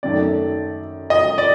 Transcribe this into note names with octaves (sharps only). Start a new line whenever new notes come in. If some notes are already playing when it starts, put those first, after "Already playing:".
F#2 D#3 F#3 A3 D5
D#5
D5